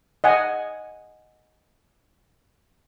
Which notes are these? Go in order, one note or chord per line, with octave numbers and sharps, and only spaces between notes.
D#5 F#5 G#5